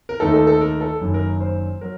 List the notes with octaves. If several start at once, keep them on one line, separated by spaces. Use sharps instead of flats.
A#4
D#2 D#3 A3 D#4 A4
A4
A4
A#4
A4
F#1 F#2 D#3
A#4
C5
F#3 A#4